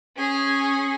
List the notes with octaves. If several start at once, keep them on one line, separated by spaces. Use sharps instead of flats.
C#4 G#4